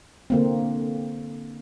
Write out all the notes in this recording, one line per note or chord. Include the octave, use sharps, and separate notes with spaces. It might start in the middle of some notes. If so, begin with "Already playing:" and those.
D3 A#3 C4